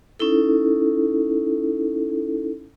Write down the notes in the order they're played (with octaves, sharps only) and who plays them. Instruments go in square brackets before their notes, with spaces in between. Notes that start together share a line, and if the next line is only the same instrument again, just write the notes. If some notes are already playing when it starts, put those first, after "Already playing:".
[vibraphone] C#4 D#4 E4 A4